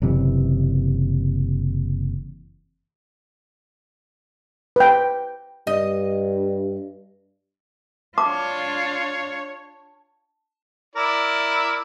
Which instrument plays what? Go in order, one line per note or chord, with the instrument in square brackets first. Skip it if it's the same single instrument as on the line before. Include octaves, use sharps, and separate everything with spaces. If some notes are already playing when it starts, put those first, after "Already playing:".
[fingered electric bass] F#1 C3 E3
[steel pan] B4 G5
[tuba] G2 [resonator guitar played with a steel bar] D#5
[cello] D4 F4 [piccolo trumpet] C#5 [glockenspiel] A5 [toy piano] D6
[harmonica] E4 A#4 D5